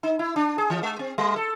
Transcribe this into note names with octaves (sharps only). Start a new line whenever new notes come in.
D#4
E4
D4
G#4
E3
G#3
C4
G3
A4